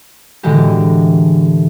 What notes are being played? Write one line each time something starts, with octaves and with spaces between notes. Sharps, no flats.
A2 D3 E3 G#3 F#4 G4